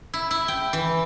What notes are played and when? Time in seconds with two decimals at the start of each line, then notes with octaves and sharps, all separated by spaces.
0.14 E4
0.31 E4
0.48 G5
0.73 E3